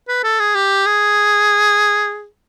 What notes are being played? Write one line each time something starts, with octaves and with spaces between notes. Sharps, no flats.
B4
A4
G#4
G4
G#4